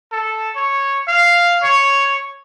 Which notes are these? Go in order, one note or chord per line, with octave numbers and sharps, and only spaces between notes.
A4
C#5
F5
C#5